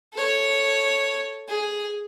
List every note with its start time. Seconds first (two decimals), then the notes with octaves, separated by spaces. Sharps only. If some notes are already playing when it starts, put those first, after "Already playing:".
0.14 A4 C#5
1.48 G#4